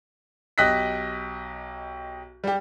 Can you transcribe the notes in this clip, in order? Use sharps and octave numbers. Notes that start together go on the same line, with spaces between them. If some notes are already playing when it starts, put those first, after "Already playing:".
B1 G4 D#5 F#6 A#6 B6
G3 G4